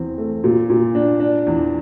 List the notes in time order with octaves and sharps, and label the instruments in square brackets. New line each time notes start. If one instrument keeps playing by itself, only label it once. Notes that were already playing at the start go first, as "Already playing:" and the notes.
Already playing: [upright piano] E2 C4
A3
A#2
A#2
D4
D4
E2